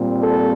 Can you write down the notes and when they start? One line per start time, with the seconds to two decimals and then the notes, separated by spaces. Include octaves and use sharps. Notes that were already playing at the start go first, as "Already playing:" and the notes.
Already playing: A#2 G3 C4
0.23 A4